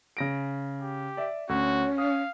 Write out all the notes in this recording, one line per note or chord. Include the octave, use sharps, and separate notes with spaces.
C#3 A#6 D7
G4
D5 E5
D2 C#4 F#4
F5 D#6